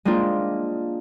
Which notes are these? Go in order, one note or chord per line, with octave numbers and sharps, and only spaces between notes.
G#3 A#3 C4 D4 F4